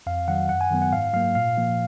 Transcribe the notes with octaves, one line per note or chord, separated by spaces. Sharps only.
F2 F5
D#3 F#3 F#5
F#2 F#5
G#5
D#3 F#3 B3
F#5
G#2 F5
F#3 A#3 F5
A#2 F5
F3 A#3